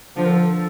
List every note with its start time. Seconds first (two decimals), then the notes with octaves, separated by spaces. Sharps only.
0.16 D3 F3 C5
0.25 A#4
0.29 A4
0.42 A4